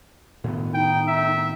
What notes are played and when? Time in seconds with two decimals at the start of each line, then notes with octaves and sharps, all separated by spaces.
0.44 A2 D#3 B3
0.74 D#4 G5
1.08 E5